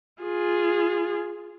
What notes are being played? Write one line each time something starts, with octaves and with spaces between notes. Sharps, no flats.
F4 G#4